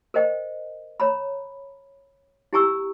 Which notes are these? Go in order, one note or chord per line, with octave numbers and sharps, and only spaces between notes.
A#4 C5 D#5 G5
C#5 A#5 B5
E4 G4 G#5 A#5 C#6 E6